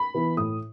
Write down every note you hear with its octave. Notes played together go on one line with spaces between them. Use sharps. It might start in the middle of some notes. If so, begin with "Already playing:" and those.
Already playing: B5
E3 B3 E4
A2 D#6